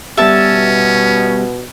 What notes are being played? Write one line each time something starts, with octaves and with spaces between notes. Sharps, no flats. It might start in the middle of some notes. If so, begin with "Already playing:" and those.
G3 B3 C#4 G4 E5 A5
B2